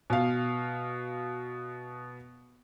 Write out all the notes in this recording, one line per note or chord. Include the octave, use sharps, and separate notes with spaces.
B2 F5